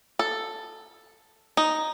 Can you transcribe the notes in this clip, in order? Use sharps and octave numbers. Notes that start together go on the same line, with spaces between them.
A4
D#4